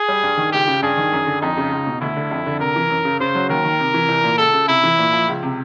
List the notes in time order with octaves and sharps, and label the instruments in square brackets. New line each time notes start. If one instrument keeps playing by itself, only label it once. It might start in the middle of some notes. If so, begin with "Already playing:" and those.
Already playing: [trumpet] G#4
[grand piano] G3
G2
D#3
[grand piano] C#2 [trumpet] G4
[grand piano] C#3
[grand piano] G2 [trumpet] G#4
[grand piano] D#3
F#2
D3
[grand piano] F2 [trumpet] D#4
[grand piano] C#3
C#2
B2
[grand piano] D2 [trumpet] E4
[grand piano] D3
F2
D3
[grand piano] C3 [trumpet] A#4
[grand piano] E3
F#2
C#3
[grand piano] C#3 [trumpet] C5
[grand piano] F#3
[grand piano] D#2 [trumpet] A#4
[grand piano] D#3
C3
E3
C2
A#2
[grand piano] C#2 [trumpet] A4
[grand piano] C#3
[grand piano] C3 [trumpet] E4
[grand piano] E3
A#2
F3
C#2
C3